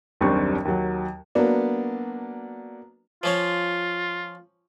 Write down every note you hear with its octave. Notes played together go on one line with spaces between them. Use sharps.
F#1 D#2 G3 C4 D4 C#6
D#2 F#3
F#3 A#3 B3 D4
F3 C#4 F4 C#5